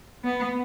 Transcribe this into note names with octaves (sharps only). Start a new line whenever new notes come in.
B3